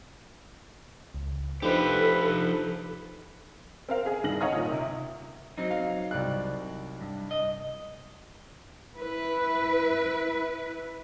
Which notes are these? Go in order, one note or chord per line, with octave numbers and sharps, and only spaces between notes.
C#2
F3 D4 D#4 G4 A4 B4 C5
C4 A#4 F5
G#4 G#5
C2 G2 D#3 A#6 F#7
C#5 D#5 F5 F#5 A#5 D#6
A#2 D#3
C3
F#3 C4 D#4
F5
C2 D5 F#6
G2
D#5
E4 B4